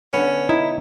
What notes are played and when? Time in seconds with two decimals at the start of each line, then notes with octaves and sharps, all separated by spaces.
0.14 D3 B3 C#4
0.49 D#4 E4